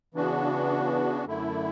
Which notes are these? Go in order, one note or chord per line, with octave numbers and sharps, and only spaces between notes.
C#3 E3 B3 D4 F#4
F#2 D3 A3 E4